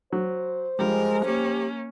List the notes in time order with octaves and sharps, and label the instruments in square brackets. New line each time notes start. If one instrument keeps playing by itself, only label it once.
[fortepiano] F#3 [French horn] C5
[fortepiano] F3 G3 [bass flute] G#3 [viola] A#4
[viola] A#3 C#4 [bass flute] G4